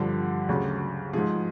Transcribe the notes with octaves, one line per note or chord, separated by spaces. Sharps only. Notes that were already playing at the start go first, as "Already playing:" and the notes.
Already playing: G2 D3 F3 G4
D2 C#3 F#3
G#2 F3 G#4